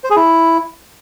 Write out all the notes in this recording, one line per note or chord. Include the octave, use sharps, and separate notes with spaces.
C5
G#4
E4